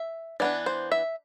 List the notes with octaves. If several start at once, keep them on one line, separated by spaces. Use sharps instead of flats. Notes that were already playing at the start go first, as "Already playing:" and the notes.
Already playing: E5
E3 B3 D4 D5
C5
E5